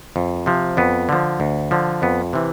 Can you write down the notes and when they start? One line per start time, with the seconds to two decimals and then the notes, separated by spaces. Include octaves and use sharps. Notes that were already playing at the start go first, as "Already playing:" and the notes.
0.16 F2
0.46 C3 F3
0.77 F2 B3
1.09 D3 F3
1.40 D2
1.71 D3 F3
2.02 F2 B3
2.33 C3 E3